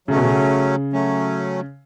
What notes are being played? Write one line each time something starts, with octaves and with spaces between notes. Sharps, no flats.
C#3 F#3 A3 C#4
B2
C#3
F#3 A3 C#4